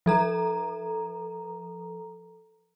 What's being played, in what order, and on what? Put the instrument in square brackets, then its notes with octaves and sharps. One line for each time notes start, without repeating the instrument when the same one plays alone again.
[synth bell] F3 A4 A#5